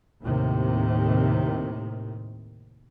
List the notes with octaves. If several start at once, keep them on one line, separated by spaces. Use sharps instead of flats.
D#2 A2 C3 D#3